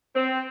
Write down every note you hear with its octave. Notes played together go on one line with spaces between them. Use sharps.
C4